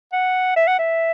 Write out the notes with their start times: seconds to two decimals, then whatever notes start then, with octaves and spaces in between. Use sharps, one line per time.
0.13 F#5
0.56 E5
0.68 F#5
0.79 E5